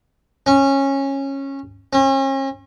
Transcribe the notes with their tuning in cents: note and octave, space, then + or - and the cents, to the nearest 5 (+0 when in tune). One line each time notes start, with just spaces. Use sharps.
C#4 -15
C#4 -40